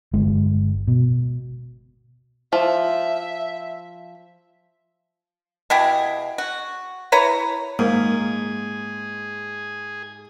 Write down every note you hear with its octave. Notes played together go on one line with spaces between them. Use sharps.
G1 G#3
B2
F3 E5
B2 E4 G4 G#4
F#4
E4 B4 C#5 A#5
G#2 A#3 G#4